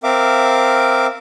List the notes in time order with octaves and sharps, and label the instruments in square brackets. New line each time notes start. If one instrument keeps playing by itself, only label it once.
[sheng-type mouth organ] C4 A#4 E5 F5 D6